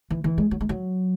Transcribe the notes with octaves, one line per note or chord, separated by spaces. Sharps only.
E3
E3
G#3
F#3
G#3
F#3